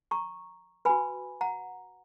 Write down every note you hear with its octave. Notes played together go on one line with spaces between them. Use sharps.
A#5 C#6
F#4 B4 G#5 B5
F#5 A#5